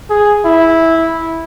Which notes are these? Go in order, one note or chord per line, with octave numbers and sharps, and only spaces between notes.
G#4
E4